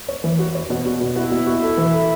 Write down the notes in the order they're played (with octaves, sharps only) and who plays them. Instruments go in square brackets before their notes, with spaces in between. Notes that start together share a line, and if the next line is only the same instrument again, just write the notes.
[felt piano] C#5
E3
F#4
C#5
B2
F#4
B2
[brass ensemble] E4 [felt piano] F#4
[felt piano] B2
F#4
A4
E3
A4